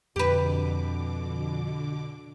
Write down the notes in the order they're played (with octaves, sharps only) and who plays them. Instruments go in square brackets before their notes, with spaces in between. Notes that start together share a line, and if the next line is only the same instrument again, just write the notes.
[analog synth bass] F2 [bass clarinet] B2 [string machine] D3 D6 [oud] G4 B4